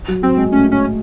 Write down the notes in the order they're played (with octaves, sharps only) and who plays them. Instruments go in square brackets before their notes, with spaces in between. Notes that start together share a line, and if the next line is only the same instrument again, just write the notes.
[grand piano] F#3
[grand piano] F#3 [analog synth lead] C4
[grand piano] G#3
[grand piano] A3 [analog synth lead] C#4
[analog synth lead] C#4